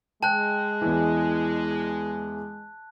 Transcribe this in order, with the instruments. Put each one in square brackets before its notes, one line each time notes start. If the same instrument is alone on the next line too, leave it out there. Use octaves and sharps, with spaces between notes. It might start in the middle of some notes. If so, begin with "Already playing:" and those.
[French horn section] G#3 [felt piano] G5 [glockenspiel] A5 F#6
[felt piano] E2 E3